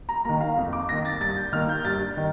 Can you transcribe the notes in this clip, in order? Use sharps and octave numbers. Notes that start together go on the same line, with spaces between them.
A#5
D#3 A#3 A#5
F5
F2
D6
D#3 A#3 A#6
A6
G2 A6
G6
D#3 A#3 F6
G6
G2 A6
D#3